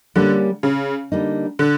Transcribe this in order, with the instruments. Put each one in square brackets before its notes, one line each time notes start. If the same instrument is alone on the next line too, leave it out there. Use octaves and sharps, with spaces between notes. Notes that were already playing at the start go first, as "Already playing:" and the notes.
[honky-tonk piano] D3 [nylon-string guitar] G3 A#3 C#4
[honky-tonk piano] C#3
[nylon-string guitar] D3 G3 A#3 D#4
[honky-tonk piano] D3